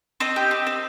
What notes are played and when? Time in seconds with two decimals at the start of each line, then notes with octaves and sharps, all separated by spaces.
0.20 C4 D#5
0.36 G4
0.51 C4
0.67 C4